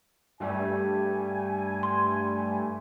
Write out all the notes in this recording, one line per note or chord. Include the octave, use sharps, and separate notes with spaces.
G2 G3 A3 G#5
C6